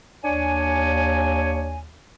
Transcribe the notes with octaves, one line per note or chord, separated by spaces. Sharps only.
D#2 D4 C#5 G#5